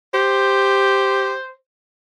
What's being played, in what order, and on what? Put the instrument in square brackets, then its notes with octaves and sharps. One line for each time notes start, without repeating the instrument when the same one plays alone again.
[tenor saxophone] G4 [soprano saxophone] C5